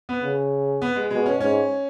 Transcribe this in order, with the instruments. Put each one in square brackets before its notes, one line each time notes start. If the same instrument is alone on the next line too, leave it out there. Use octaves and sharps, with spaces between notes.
[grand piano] B3
[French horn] C#3
[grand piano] B3
G#3
[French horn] B2 [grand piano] G#3
[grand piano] C#4
[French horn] G#2 [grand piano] C#4